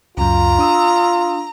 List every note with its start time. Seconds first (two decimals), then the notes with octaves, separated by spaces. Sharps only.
0.17 C#2 F#2 F4 A#5
0.59 D4 D#6 E6